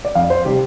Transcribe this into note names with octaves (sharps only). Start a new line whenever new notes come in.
D5
F2 F5
C5
C3 G3 G4